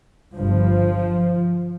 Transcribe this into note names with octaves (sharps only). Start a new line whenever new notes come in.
G1 G2 F3